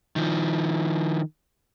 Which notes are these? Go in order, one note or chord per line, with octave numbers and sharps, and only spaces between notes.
D#3 F3